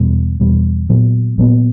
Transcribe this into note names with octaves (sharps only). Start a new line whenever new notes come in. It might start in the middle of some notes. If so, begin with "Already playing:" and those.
Already playing: E2 B2 G3
E2 B2 G3
A#2 F#3 B3
A#2 F#3 B3